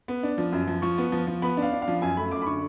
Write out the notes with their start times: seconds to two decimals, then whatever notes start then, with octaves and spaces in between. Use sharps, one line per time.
0.08 B3
0.23 D4
0.38 F3
0.52 F#2
0.67 F3
0.82 F3 C#6
0.98 B3
1.12 F3
1.27 F3
1.42 B3 B5
1.57 D4
1.62 F5
1.72 D4
1.82 F5
1.88 F3
2.02 F#2 G#5
2.17 A3 B5
2.31 F#2 D6
2.42 B5
2.46 D3 C#6